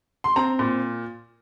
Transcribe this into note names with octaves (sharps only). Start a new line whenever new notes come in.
C6
C4 A#5
A#2